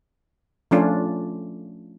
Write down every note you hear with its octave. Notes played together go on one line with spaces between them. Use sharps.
F3 A3 C#4 D4 F4